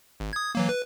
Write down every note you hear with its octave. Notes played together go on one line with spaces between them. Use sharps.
G#1
D#6 G#6
E3 F#3 A#3
B4